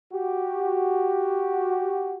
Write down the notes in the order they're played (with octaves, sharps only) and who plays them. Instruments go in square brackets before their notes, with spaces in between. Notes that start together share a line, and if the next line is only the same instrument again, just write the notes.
[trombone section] F#4 G4